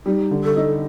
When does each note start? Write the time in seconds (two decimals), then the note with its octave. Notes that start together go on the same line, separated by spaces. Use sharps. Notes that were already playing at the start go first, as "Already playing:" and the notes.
0.05 G3 D#4
0.31 D3
0.44 A4
0.56 D#4